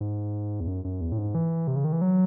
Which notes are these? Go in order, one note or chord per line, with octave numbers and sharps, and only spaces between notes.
G#2
E2
F#2
F#2
E2
A2
G#2
E3
C3
C#3
D#3
E3
F#3